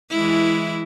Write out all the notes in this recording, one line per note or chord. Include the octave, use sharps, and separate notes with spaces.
E3 G#3 E4